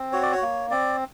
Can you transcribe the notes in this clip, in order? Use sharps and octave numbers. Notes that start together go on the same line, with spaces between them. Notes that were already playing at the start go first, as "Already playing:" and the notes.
Already playing: C4
F#4 C#5
D5
C#5
A#3
C4 D5